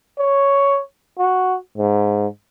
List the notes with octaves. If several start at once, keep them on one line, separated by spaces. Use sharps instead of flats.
C#5
F#4
G#2